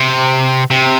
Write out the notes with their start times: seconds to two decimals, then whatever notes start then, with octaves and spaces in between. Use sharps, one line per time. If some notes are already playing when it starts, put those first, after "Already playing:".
Already playing: C3
0.70 C3